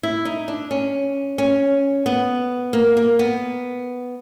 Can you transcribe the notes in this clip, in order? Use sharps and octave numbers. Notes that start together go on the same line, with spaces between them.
E4
D#4
D4
C#4
C#4
B3
A#3
A#3
B3